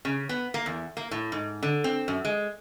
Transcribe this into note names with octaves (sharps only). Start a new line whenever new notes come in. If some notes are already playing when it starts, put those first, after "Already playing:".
C#3
B3
A#3
E2
A#3
A2
G#2
D3
C4
F#2
G#3